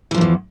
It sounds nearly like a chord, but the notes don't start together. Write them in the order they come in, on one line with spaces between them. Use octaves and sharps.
E3 F3 G2 E2